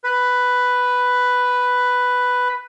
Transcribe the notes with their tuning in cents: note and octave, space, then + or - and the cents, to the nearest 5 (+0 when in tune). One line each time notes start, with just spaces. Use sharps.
B4 +5